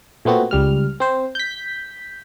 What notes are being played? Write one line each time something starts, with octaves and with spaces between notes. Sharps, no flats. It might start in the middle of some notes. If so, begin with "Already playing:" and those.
A#2 A3 B3 C4 F#4
C#2 G3 F6
C4 C5
G6 B6